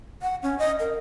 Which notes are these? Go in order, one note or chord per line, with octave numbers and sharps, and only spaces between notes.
F#5
C#4
D#5
A#4